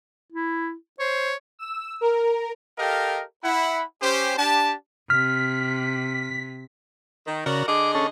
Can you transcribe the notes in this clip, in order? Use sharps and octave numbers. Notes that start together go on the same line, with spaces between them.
E4
C5 C#5
E6
A#4
G4 A4 A#4 D#5 F5 G5
E4 F#5 B5
C#4 G4 C5
D4 G4 A5
C3 F6 B6
D#3
C#3 F#4 A#4 D5
D3 G#4 D#5 D6
C#4 A4